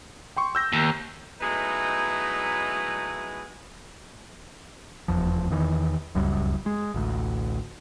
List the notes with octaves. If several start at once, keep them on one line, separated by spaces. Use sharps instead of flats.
G5 C6 C#6
E6 G6 A#6
D#2
F#3 G#3 A3 B3 D#4 E4
F1 B1 E2 F3
E2 D#3 E3
D1 C#2 F#2 G3
G#3
A1 D2